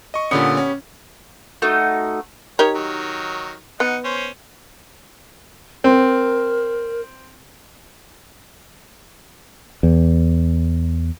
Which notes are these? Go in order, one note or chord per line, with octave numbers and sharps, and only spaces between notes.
D#5 C#6
A#2 D3 B3 C#4 G4
C#4
A3 D#4 F#4
D#4 G4 A#4 C#5
D#3 F#3
B3 D#4 F#5
C#4 C5
C4 A#4
E2